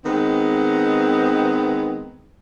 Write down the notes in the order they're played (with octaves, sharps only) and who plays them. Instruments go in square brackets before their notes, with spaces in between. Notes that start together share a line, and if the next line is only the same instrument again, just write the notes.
[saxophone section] D#3 G#3 B3 C4